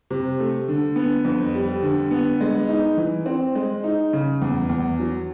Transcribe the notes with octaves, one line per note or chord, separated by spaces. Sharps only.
C3
A3
D3
B3
F2
G3
D3
B3
G#3
D#4
E3
C4
G#3
D#4
C#3
E2
E2
F#3